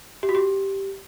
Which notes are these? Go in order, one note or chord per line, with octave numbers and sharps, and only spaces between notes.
G4
F#4
G4